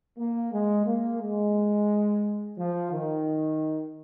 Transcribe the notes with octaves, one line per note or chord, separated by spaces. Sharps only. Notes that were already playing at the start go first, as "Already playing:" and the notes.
A#3
G#3
A#3
G#3
F3
D#3